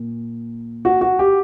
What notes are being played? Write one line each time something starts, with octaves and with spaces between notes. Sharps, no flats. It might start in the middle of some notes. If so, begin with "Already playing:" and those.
Already playing: A#2
F#4
F#4
G4